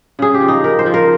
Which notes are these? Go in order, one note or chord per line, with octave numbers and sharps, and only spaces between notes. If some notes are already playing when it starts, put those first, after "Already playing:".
C#3 G#4
G4
F3
D#4
C#3 A#4
C5
F3
A#4